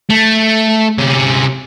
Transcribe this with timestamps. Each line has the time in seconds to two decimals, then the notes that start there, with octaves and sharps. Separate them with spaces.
0.10 A3
0.99 C3 C#4